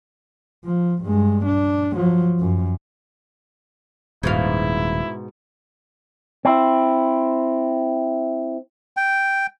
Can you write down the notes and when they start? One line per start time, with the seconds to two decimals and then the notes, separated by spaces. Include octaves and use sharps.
0.65 F3
1.03 G2 G#3
1.46 D4
1.94 F3 F#3
2.39 F#2
4.23 D#1 G#2 B2 E4 F5
6.45 C4 E4
8.97 G5